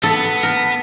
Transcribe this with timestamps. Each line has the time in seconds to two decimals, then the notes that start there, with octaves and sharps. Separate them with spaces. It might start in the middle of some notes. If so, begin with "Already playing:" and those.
0.03 B3 A4
0.43 A#4